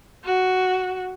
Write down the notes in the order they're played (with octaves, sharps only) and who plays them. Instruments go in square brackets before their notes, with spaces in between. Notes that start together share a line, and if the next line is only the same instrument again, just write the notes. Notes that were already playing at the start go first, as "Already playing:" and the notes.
[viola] F#4